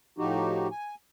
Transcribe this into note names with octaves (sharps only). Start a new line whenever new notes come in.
A2 F3 D#4 F#4 G4
G#5